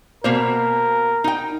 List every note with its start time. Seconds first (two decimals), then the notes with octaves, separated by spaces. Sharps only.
0.24 B2 A#3 A#4 C5
1.24 D#4 G5